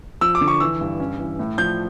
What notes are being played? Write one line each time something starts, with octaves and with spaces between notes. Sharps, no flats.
F3 E6
D6
D3
C#6
E3 E6
G2
C#4
E3
A2
F3 G6